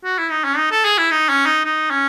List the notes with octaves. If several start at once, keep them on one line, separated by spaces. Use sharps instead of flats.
F#4
E4
D#4
C#4
D#4
A4
G#4
E4
D#4
C#4
D#4
D#4
C#4